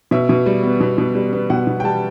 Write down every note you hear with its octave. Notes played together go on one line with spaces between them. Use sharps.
B2 E5
B2
G3
B3
B2
B2
G3
B3
B2 F#5
B2
G5
G3 A5